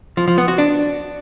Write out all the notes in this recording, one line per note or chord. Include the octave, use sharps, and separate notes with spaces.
F3
F3
B3
F#4
D4